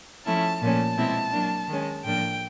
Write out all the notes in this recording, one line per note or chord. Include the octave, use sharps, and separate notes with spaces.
F3 A3 C#4 E4 A5
A#2 F3 A3 C#4 A5
B2 G#3 C4 E4
F#3 A#3 D4
D#3 G#3 C#4
A2 F3 A#3 D4 G5